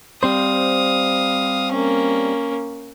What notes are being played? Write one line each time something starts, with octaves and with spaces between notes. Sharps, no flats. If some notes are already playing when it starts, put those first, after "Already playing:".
G3 C4 C5 F5 D#6
A#3 C#4